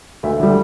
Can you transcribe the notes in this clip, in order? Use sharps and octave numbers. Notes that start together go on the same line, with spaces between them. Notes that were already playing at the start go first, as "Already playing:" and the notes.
D2 E5
D3 G3